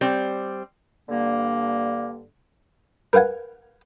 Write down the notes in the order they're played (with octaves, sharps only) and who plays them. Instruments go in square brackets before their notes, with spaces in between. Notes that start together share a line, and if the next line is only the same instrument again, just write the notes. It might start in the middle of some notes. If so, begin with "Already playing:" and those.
[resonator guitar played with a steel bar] G3 C4
[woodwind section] G2 D3 A#3
[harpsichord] A#4 B4 F5 F#5 G#5